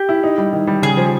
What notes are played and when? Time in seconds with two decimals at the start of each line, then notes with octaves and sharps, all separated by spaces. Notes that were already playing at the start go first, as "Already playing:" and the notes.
Already playing: G4
0.09 E4
0.23 D#4
0.38 G3
0.53 D#3
0.67 G3
0.82 C#3 G#4
0.97 F3